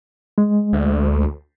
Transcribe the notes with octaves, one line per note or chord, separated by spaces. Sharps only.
G#3
D2